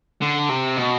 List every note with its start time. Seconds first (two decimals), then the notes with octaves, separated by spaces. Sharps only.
0.22 D3
0.49 C3
0.77 B2